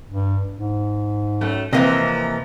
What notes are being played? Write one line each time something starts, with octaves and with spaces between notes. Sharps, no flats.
G2
G#2
F#2 A3
C3 E3 F3 A#3 C4 D#5